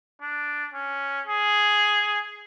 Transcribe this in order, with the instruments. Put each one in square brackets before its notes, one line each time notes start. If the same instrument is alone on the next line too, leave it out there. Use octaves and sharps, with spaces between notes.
[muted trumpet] D4
C#4
G#4